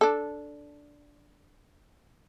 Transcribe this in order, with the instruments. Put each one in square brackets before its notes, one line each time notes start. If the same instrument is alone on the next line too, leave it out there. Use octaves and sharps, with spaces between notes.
[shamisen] D4 A4